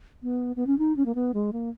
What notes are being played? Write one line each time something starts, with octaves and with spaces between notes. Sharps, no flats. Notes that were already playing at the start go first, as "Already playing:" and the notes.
B3
B3
C#4
D#4
C#4
A#3
B3
G#3
A#3